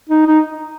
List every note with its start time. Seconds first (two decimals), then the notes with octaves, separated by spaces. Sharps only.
0.09 D#4
0.26 D#4